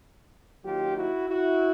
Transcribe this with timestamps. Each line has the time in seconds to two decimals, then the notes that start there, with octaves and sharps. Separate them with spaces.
0.63 D#2 D#3 F#3 A#3 F4 G4
0.96 E4 F#4
1.28 E4 F#4